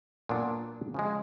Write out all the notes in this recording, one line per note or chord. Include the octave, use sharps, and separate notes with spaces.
A#2 F#3 B3 D4
C#3 F3 G#3